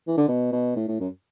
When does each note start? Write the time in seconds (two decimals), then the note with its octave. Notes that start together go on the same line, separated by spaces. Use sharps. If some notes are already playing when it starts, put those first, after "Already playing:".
0.07 E3
0.17 D3
0.28 B2
0.52 B2
0.76 A2
0.88 A2
1.00 F#2